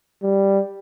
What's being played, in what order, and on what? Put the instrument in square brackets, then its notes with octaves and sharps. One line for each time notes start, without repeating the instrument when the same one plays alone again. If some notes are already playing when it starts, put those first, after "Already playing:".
[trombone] G3